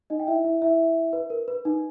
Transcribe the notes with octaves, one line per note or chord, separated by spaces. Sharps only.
D#4 D#5
G5
E4 E5
E4 E5
E4 E5
B4
A#4
B4
D#4